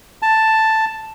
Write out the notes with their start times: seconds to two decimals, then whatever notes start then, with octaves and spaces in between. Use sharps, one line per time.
0.22 A5